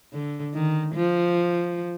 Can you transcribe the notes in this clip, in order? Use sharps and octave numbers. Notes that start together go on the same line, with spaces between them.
D3
D#3
F3